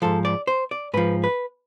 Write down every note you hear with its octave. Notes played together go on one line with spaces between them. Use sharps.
G#2 F3 A4
D5
C5
D5
G#2 F3 B4
B4